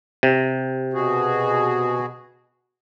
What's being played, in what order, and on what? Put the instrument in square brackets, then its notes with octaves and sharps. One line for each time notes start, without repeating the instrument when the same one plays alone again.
[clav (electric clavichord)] C3
[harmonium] B2 F#4 G#4